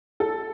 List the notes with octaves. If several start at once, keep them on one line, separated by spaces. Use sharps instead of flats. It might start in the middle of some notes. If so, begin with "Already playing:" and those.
A4